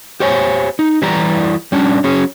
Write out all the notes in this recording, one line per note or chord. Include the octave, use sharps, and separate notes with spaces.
G4 C5 C#5 G#5
D#4
E3 G3 E4 G4 D5 A#5
G3 C#4 D4
F#3 C#4 G#4